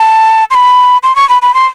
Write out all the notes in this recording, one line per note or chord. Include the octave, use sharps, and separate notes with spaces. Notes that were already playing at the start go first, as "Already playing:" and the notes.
Already playing: A5
C6
B5
C6
C#6
B5
B5
C6